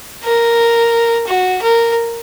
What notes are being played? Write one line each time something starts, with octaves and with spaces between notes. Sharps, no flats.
A#4
F#4
A#4